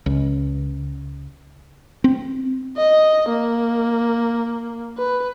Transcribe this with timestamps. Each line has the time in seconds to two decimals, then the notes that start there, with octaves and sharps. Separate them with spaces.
0.06 C#2
2.04 C4
2.77 D#5
3.29 A#3
4.98 B4